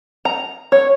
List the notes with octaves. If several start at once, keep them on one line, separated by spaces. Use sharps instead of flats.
A#5
C#5